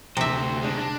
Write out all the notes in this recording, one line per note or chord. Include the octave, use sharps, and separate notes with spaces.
D2 C3 C5 E5
G#3 D4
D4